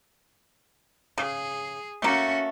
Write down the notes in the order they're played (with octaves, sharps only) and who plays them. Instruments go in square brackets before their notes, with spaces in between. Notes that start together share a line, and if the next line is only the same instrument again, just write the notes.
[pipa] C#3 [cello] G#4
[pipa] A3 A#3 [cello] C#4 F#4